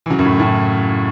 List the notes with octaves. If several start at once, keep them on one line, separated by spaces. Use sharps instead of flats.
E3
C#3 F#3
F#2
A2
A2 C#3